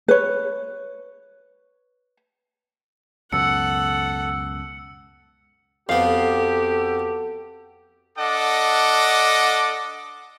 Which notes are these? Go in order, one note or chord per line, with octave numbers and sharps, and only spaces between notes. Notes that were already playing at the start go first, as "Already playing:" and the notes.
B4 C#5
C#2 F#2 B2 A4 F#5 E6 C#7
F2 B3 F#4 G4 A4 F5
D4 A4 D#5 F#5 D6